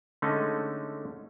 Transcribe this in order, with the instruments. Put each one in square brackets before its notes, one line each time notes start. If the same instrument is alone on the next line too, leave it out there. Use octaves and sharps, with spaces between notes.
[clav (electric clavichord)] D3 G#3 A3 C#4 D#4